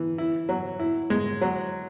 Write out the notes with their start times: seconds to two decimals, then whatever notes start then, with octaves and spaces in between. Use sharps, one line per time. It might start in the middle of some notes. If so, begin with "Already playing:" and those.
Already playing: E3
0.18 E4
0.49 F#3
0.79 E4
1.10 G#3
1.41 F#3